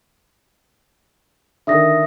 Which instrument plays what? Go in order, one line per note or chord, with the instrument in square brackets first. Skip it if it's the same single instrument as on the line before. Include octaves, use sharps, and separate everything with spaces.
[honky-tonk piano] D3 D#3 [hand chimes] E5 D#6 A#6